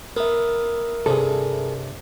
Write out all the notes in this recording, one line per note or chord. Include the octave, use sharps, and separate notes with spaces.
B3 A#4 E5
G2 C3 G#4 A4